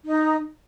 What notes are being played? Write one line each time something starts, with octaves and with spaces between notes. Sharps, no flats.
D#4